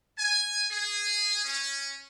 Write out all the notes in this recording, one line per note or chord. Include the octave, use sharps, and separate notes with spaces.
G#5
G#4
C#4